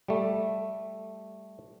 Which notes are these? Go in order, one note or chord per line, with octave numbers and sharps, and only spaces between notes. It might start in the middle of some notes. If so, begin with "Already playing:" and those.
G3 A3